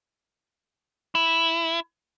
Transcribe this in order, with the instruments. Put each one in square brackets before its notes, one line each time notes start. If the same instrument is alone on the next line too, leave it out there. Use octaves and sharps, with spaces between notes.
[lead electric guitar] E4